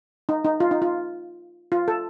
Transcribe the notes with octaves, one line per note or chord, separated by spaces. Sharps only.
D#4
D#4
F4
D#4
F4
F4
A4